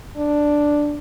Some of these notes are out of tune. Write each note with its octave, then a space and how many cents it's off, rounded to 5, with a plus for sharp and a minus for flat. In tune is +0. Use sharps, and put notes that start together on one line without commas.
D4 +0